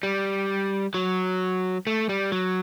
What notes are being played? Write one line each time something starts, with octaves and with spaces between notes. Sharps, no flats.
G3
F#3
A3
G3
F#3